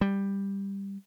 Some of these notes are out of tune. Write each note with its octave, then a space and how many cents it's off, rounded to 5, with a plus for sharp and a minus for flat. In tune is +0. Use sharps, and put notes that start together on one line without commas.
G3 +10